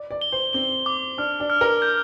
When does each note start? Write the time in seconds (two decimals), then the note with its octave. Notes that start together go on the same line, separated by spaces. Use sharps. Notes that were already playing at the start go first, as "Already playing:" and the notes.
Already playing: D5
0.11 D5
0.21 G7
0.32 C5
0.53 C4 G7
0.86 D6
1.18 D4 F6
1.40 D4
1.50 F6
1.61 A#4
1.82 G6